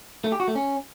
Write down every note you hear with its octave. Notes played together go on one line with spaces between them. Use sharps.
A3
G4
F#4
A3
C#4